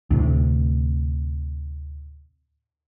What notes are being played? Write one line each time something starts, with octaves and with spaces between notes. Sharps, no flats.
D2 A2 C3